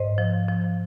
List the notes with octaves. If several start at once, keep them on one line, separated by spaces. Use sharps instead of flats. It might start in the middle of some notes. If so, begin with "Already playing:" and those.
Already playing: G#2 C5 D#5
F3
F3